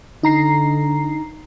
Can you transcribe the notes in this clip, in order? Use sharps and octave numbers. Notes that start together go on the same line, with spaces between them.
D3 D#4 A#5 C7